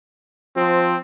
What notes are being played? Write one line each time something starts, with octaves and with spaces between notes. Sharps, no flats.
F3 C4